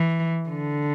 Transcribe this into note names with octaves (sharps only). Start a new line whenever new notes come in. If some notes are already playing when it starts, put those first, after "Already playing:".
Already playing: E3
D3